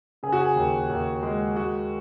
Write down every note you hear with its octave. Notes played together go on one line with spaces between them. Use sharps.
C#3 G#4
F#4
G#4
D#2
D#2
G#3
G#3 F#4